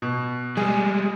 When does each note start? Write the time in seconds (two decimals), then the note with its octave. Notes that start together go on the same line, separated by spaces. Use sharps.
0.02 B2
0.57 G3 G#3 G#4